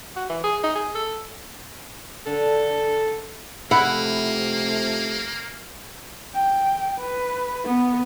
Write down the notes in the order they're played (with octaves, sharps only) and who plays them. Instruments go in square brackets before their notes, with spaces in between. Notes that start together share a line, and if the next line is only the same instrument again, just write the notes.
[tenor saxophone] F#4
E3
G#4
D#4
G#4
A4
[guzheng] D3 [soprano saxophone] A4
[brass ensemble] C3 F3 A3 [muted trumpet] A#3 [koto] E4 [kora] F#5
[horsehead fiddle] G5
B4
B3